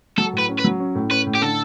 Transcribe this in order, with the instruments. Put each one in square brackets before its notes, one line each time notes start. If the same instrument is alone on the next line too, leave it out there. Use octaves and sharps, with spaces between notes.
[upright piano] F#3 [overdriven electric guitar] A4
[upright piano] A2
[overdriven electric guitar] B4
[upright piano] C#4
[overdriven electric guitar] B4
[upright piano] F#3
C#4
A2
[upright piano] C#4 [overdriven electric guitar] B4
[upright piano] A2
[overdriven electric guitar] G4
[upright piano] D3 [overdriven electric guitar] A4